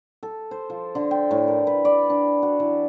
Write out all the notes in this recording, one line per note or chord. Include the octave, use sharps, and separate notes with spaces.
A4
C5
F3
D3
G5
A2
A#4
B4
D5
D4
F#4
E3